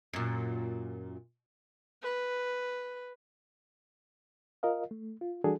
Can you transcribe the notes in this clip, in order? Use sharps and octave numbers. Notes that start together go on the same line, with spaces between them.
F#2 A#2
B4
F4 A#4 D#5 F5
A3
F4
E3 G3 D4 F#4 G#4 A4